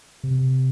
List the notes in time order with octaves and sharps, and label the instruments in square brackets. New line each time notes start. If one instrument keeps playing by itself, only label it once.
[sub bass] C3